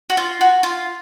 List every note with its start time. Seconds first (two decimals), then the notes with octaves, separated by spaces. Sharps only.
0.10 F#4
0.17 F4
0.41 F#4
0.63 F4